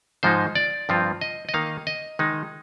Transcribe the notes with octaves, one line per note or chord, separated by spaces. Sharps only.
G#2 F3 G#3 D#4 C5
D5
G2 F3 C4 F4
D#5
D#5
D#3 A#3 D#4 F5
D#5
D#3 G#3 D#4